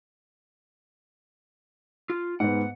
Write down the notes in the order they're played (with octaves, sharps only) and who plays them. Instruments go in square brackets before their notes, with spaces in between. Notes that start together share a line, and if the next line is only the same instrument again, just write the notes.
[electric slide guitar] F4
[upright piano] G#2 B3 [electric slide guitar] F#5